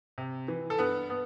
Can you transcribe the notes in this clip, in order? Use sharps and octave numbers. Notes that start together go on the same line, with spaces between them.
C3
E3
A4
G2 B3 B4
B3